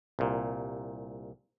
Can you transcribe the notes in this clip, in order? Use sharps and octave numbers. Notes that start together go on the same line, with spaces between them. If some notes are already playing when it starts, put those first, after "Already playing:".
C2 A#2